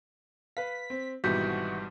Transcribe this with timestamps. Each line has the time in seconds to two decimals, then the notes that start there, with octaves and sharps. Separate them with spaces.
0.57 B4 F5 B6
0.90 C4
1.24 G#1 G#2 B2 E3 G3 F#4 G6 B6